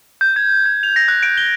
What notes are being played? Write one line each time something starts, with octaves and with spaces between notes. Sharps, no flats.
G6
G#6
G#6
F7
A#6
F#6
D7
G7